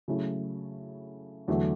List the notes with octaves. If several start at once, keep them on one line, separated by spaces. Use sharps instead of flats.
C#3 F#3 A3 E4
E2 D3 F#3 A3